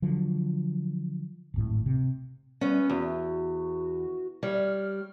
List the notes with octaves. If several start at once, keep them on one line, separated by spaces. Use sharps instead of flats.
D3 F3 F#3
D1 G#1 A2
C3
G3 B3 C#4
E2 F#4
G3 C#5 F6